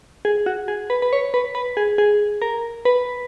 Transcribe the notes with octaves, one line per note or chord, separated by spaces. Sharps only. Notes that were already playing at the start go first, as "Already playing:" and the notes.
G#4
F#4
G#4
B4
B4
C#5
B4
B4
G#4
G#4
A#4
B4